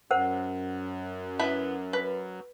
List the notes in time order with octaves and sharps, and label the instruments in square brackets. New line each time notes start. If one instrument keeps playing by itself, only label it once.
[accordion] F#2 [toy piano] A#4 C5 F#5
[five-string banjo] B3 E4 B5
B4